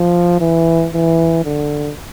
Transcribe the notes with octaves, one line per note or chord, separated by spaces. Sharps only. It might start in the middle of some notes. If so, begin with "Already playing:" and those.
Already playing: F3
E3
E3
D3